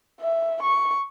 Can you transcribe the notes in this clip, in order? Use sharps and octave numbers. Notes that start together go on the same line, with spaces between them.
E5
C#6